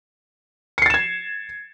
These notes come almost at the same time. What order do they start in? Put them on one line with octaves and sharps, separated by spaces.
C#7 C7 A6 E7 G#6